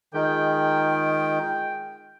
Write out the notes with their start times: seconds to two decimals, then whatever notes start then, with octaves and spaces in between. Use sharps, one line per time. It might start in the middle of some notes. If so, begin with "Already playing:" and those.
0.14 D#3 G#3 F4 G5